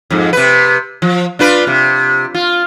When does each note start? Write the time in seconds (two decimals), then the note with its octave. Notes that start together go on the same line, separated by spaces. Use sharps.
0.10 F2 G#2
0.33 C3 B4
1.02 F3
1.39 D4 F4 B4
1.67 C3
2.35 F4